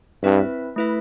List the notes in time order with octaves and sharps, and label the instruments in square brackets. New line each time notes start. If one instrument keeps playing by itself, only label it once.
[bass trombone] G2 [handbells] C4 E4 B4 E5
[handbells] A3 E4 B4 E5